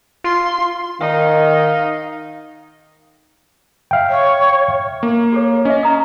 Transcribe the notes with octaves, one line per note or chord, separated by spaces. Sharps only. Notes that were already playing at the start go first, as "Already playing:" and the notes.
F4 C6
D#3 D#4 F5
E5 F5 G5
C#5
A#3
G4 A4 C#5
C#4 D#5 E5
D#5 A#5 D#6